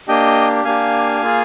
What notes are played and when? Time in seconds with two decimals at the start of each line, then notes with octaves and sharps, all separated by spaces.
0.08 A#3 D4 G4 D#5 G5
0.65 A#3 D4 G4 F5 G#5
1.22 A#3 F4 G#4